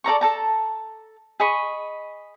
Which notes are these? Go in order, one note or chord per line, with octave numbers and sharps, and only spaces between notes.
A4 D5 A#5 C#6
A4 A5 A#5
G#4 D#5 B5 C#6